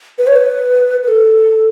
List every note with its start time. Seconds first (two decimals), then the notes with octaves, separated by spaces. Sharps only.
0.18 B4
0.27 C#5
0.36 B4
1.03 B4
1.08 A4